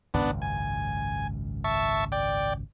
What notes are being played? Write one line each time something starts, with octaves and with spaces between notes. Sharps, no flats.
G#1 C#2 F#2 B3 D4
G#5
E5 A5 C#6
D5 G5